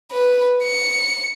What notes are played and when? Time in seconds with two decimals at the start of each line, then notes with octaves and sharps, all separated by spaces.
0.12 B4
0.64 C#7